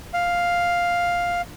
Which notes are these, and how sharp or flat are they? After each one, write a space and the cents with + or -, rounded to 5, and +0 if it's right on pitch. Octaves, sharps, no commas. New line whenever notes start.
F5 +5